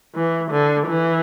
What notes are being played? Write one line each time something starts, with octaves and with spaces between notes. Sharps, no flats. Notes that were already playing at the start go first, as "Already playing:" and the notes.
E3
D3
E3